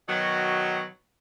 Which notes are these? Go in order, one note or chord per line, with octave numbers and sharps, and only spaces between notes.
B2 D#3 F#3